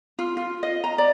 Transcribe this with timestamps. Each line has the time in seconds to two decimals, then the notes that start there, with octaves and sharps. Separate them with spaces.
0.19 F4
0.37 F4
0.63 D#5
0.84 A#5
0.98 D5